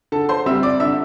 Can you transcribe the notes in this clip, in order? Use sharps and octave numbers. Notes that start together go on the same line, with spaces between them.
D3 A4 A5
C5 C6
G3 C4 E5 E6
D5 D6
D3 E5 E6